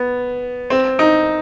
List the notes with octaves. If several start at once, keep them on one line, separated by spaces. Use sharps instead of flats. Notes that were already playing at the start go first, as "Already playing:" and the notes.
Already playing: B3
C4
D#4